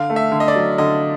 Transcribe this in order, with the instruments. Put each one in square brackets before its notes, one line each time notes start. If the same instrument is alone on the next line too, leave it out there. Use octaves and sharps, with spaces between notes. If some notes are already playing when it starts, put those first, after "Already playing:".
Already playing: [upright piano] D3 [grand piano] F5
[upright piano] A3
[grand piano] E5
[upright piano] D3
[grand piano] D#5
D5
[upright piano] F#3
[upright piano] D3 [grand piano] D#5